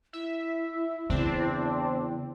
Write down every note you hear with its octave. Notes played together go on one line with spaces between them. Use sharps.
E4 E5
E2 C#3 C4 D4